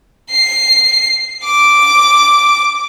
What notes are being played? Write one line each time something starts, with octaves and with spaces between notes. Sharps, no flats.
C7
D6